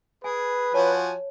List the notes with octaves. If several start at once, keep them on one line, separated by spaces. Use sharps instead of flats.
G#4 B4 G#5
F3 F#4 C#5 G#5 A5